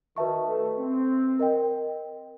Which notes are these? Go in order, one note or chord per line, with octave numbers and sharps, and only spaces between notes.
D#3 F#4 B4 E5 A5 C#6
A3
C4
A#4 D#5 G5